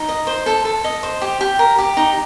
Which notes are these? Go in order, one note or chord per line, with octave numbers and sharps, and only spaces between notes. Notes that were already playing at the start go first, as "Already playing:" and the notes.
Already playing: D#4
D#5
C5
A4
A4
D#5
C5
G4
G4
A#4
G4
D#4